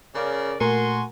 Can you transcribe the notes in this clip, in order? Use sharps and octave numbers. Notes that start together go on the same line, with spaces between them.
C#3 A#4 D5
A#2 A3 F#4 A#4 G#5 C6